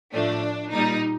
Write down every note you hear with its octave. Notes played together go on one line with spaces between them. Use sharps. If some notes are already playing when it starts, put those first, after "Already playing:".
A2 F3 A3 D4
A#2 G3 D#4